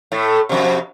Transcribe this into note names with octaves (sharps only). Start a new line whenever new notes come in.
A2 A3
F2 C3